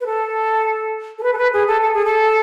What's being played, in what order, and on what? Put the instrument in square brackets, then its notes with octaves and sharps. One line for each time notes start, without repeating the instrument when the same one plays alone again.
[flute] B4
A4
A4
B4
A4
B4
G#4
A4
A4
G#4
A4